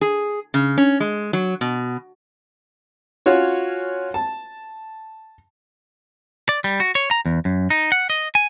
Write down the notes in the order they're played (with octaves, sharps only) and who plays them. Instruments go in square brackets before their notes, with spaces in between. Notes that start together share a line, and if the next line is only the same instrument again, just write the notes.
[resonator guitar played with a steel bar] G#4
C#3
C#4
G#3
F#3
B2
[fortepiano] C#4 F4 F#4 C#5
A5
[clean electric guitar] D5
G3
F#4
C#5
A#5
E2
F#2
D#4
F#5
D#5
G#5